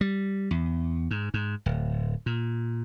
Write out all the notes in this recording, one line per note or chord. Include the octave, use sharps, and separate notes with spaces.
G3
E2
G#2
G#2
D1
A#2